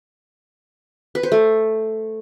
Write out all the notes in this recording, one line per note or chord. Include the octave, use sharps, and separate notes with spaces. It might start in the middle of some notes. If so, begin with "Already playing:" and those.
B4
C5
A3